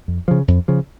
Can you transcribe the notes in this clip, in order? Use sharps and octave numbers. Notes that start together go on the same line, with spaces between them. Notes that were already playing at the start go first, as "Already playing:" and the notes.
F2
C#3 F3
F2
C#3 F3